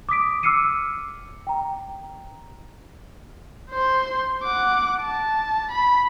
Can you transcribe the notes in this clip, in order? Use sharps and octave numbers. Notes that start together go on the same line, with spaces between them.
D6 D#6 B6 D7
D6 E6 F6 C7 C#7 D#7
G5 A#5
C5 C6
F#5 D6
A5
B5